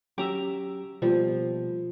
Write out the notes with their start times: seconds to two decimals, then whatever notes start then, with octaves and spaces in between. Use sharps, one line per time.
0.18 F#3 C#4 G4 E5 A#5 D6
1.02 B2 F3 G3 A#3